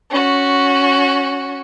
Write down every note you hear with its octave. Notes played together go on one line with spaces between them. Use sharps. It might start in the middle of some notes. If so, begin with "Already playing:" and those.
C#4 F#4